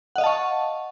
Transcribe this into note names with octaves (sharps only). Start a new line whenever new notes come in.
D#5 F5 F#5 A5 C#6